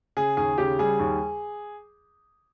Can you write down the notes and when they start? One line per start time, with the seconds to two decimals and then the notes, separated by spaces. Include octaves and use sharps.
0.17 C#3 G#4
0.37 D#2 G#4
0.58 C#3 G4
0.79 G3 G#4
0.99 D#2